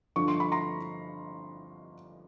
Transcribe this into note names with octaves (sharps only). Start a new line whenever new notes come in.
G2 D3 F3 C#6
C6
B5
A#5 C6